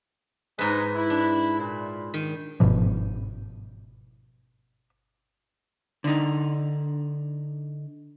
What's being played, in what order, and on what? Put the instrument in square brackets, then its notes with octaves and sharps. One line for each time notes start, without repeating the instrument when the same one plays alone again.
[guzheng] G#2 B4 [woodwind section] G#3 D#4
[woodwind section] E4
[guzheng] D4
[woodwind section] A#2
[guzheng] D#3
[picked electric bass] G1 G#2 B2 F3
[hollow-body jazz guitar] D3 D#4